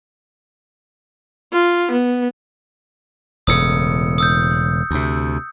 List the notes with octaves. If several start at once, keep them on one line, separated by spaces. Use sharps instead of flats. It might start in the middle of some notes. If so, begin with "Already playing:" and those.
F4
B3
E1 A2 C#3 D#6 E6 C#7
D#6 E6 G6
D2 C3